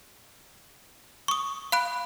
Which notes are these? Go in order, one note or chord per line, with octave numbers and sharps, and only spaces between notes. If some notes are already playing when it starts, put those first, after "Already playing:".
C#6 D#6
F5 B5 F#6 D7